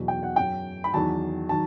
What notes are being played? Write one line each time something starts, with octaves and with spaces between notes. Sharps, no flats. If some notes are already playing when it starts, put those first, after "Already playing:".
Already playing: E2 B2 F#3
G5
F#5
F#2 F#3 G5
B5
E2 D#3 F#3 A5
D#3 F#3 A5